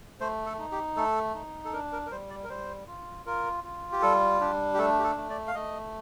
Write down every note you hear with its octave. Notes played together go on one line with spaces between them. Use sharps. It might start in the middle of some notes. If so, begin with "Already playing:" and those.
A3 C5
A4
D#4
G4
A3 A4
D#4
A4
D4 A#4
A#4
A#4
G3 C5
D5
A#4
G3 C5
F4
F4 A#4
F4
G4
G3 A4
D4 G4
G4
A3 A4
G4
A4
A3
D5
F5
A3 D#5